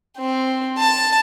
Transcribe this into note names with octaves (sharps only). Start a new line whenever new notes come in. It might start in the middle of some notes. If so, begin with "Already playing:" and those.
C4
A5